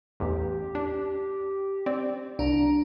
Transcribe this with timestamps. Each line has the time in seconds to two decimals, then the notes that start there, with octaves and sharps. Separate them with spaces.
0.20 A1 E2 G4
0.75 D4
1.86 C4 D5
2.39 C2 D4 A#5